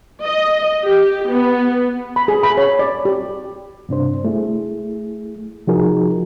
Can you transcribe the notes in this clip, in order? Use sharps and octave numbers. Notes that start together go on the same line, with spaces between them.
D#5
G4
B3
B5
G#4
B5
C#5
D5
G4
G2 C3 D4 C5
A3 E4 G#4
C3 F3 D#4 F#4 G#4 A#4